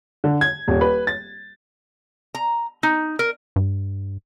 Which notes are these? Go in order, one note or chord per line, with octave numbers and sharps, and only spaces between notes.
D3
G#6
D#1
B4
A6
A#5
D#4
A#4
G2